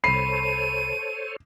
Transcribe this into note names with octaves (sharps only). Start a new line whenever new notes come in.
C2 A4 C5 C#5 B5 C7 D#7